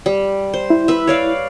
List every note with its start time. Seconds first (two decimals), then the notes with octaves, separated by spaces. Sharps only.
0.06 G3
0.54 C5
0.70 E4
0.88 B4 E5
1.07 C#5 D5 F5